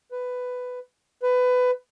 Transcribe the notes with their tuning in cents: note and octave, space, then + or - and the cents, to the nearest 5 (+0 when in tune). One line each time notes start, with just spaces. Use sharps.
B4 +10
B4 +20